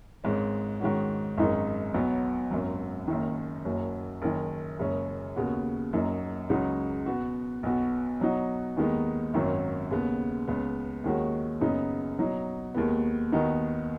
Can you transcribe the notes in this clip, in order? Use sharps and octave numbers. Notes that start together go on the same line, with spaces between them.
G#1 G#2 G#3 C#4
G#2 D#3 G#3 C#4 F#4
G#1 F#2 D#3 G#3 D#4
B1 B2 F#3 B3
G#1 F#2 F#3
F#1 F#2 D#3
F#1 F#2 F#3
F#1 F#2 D#3
F#1 F#2 C#3 G#3 C#4
D#2 C#3 B3 F#4
F#1 F#2 F#3 D#4
C#2 C#3 F#3 D#4 F#4
B2 B3 F#4
B1 B2 B3 F#4
B2 F#3 D#4 F#4
D#2 D#3 G#3 B3 D#4
G#1 F#2 D#3 F#3 C#4
D#2 C#3 B3
C#2 C#3 B3
D#2 D#3 G#3 C#4 F#4
F#2 C#3 B3 D#4
B2 F#3 D#4
D#2 D#3 G#3 B3
D#2 D#3 B3 D#4 F#4